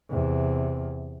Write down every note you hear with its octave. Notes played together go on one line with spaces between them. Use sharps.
E2 C3